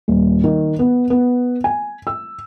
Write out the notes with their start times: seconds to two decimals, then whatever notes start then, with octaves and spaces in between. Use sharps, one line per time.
0.08 D#1
0.44 D#3
0.79 B3
1.10 B3
1.64 G#5
2.07 E6